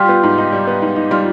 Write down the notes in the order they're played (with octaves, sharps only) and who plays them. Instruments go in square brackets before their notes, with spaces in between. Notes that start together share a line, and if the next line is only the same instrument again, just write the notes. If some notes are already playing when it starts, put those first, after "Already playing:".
Already playing: [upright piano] G3 [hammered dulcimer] F4 G4
[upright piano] B3
G#2
D#4
G3
B3
G#2
D#4
[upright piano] G3 [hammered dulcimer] F4